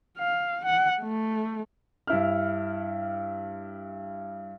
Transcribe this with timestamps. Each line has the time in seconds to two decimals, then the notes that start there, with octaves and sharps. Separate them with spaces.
0.18 F5
0.65 F#5
1.01 A3
2.07 G2 E4 F6